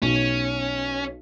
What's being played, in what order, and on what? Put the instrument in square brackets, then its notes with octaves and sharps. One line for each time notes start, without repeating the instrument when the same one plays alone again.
[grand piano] B1 [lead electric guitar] C#4